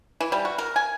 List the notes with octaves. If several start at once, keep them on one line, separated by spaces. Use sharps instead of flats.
E3
G3
F#4
A#4
G#5